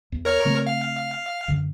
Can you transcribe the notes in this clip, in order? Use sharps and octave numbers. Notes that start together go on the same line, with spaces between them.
E2
A#4 C#5 F6
C#3 A3 C4
F5
F#2 D3